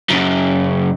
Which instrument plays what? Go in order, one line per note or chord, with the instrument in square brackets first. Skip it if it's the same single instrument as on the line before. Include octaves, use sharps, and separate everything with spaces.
[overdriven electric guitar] F#2 C#3